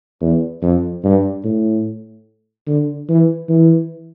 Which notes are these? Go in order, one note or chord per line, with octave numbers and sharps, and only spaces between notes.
E2
F2
G2
A2
D3
E3
E3